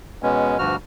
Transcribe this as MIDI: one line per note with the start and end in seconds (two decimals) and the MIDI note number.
0.23 0.58 47
0.23 0.58 56
0.23 0.58 59
0.23 0.58 61
0.59 0.76 38
0.59 0.76 43
0.59 0.76 53
0.59 0.76 66
0.59 0.76 89